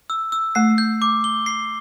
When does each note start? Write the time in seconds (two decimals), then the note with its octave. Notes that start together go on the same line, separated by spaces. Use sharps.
0.10 E6
0.32 E6
0.55 A3 C7
0.78 G6
1.02 D6
1.24 G7
1.46 C7